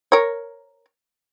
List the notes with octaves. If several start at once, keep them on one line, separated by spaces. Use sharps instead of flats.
A#4 C#5